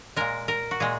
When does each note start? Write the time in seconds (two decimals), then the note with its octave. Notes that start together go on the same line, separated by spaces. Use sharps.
0.16 A#2 G#3 A#4
0.48 A#4
0.71 F#4
0.80 A#2 G#3 G#4